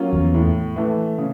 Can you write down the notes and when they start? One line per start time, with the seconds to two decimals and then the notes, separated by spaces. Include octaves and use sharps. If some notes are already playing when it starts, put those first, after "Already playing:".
Already playing: F#3 A#3 C#4 F4
0.13 E2
0.34 A2
0.76 E3 A3
1.18 C#3